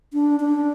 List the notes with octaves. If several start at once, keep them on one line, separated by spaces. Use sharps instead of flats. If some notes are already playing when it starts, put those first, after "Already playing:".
D4
D4